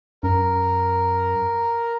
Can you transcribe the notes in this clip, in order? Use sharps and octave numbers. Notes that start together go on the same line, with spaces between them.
F#2 A#4